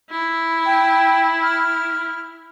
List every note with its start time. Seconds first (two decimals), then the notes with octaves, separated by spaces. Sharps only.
0.10 E4
0.66 G5
1.43 F6